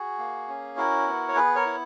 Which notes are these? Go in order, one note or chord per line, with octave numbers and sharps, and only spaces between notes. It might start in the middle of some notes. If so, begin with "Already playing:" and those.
Already playing: F#4 G#4
A#3
C#4
E4 F#4 A#4
B3
C#5
B3 G#4 B4
A#4 C#5
E4